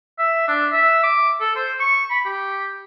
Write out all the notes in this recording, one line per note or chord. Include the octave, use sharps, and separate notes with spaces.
E5
D4
E5
D6
A4
C5
C#6
B5
G4